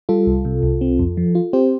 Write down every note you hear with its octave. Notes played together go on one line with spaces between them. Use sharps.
G3 F4 A4
C2
C3
C2
C4
F2
F3
F4
C4 G4 C5